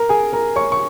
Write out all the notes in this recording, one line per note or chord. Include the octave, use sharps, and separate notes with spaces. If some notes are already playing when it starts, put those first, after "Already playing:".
Already playing: A#4 A#5
G#4 G#5
A#4 A#5
C#5 C#6
C#6